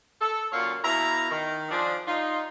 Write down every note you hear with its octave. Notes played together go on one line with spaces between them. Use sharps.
A4
F#2 A#2 A#3 F#4 C#5 F5
B2 E4 E5 F5 A#5
D#3
F3 D4 G#4
D#4 F4